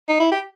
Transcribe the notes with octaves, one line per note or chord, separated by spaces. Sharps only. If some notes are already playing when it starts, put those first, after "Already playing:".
D#4
E4
G4